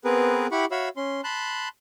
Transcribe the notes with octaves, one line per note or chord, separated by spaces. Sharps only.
B3 C4 G#4 A#4 B4
E4 G4 F#5 B5 C#6
F#4 C#5 E5 F5 B5 E6
C#4 C6
A5 B5 C6 F#6